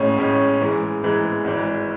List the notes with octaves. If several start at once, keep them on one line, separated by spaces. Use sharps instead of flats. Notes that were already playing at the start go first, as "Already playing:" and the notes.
Already playing: A1 A2 G#3 C#4
A1 A2 G#3 C#4
G#2 E3 G#3
G#2 E3 G#3
G#1 G#2 E3